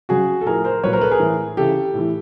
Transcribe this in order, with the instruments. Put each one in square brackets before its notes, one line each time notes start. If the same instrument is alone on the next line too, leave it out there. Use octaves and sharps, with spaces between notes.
[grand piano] C#3 F#3 F#4 G#4
A4
A2 F3 G#4 A#4
A#4 C5
A#2 F#3 B4 C#5
A#4 C5
A4 B4
G#4 A#4
A2 E3
C#3 E3 G4 A4
A2 E3